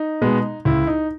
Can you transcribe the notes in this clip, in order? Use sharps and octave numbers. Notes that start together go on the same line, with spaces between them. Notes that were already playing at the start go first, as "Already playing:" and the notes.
Already playing: D#4
B2 G#3 B3
C#2 E4
D#4